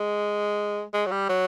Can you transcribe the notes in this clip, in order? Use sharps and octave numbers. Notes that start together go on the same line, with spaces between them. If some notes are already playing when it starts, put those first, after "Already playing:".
Already playing: G#3
G#3
F#3
G3
F#3